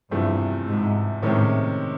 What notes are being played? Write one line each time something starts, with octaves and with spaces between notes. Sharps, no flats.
E2 G2 C3 F3 A3
G#2
A2 C3 D#3 G#3 C#4